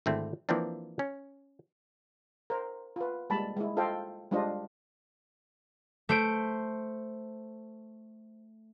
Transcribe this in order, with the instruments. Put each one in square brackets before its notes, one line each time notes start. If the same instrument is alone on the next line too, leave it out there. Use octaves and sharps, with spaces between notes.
[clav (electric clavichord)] G#1 D3 A3 C4 E4
E3 F3 A#3 C4 D4
C#4
[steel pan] A#4 C5
F4 B4
G3 G#3 A#3 A5 B5
G#3 E4
F4 A4 C5 D#5 F5 G5
G3 G#3 D4 F4 C5 D#5
[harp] A3 C5 D7